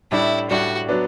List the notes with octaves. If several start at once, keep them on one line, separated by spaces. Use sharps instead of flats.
A2 G3 D4 E4
A2 G3 D4 F#4
F#3 B3 D4